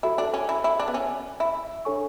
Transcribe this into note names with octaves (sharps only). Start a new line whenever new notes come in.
E4 F#4 A4 E5
D4
C#4
E4
E4
D4
B3
C#4
E4
D4 A4 C#5 G#5 C#6